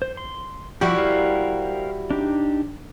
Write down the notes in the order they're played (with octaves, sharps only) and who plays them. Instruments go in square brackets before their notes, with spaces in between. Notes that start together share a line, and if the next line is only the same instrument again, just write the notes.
[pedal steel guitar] C5
C6
[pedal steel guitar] F3 G4 [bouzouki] G3 E4 F#4
[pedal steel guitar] A#4 C5 F5
D4 D#4 G4